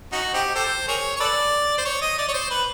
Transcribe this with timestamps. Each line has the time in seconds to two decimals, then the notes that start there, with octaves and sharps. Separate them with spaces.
0.12 C#4 D#4 F#4
0.34 C4 D#4 G4
0.55 G4 A4 C5
0.88 G#4 A#4 C#5
1.16 C#5
1.20 A4 B4 D5
1.78 C5
1.85 C#5
2.02 D#5
2.18 D5
2.28 C#5
2.33 C5
2.50 B4